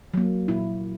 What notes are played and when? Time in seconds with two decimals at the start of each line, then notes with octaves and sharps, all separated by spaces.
0.14 F#3 A#3
0.48 A#2 E4